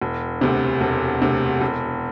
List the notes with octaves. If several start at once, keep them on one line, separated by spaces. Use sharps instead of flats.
E1
D2 C3
E1
D2 C3
E1